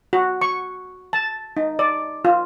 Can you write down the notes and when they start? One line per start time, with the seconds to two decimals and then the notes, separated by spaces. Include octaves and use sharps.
0.13 F#4
0.42 C#6
1.13 A5
1.57 D#4
1.79 D5
2.25 F4